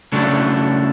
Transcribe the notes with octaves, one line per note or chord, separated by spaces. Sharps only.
C#3 F#3 A3 D4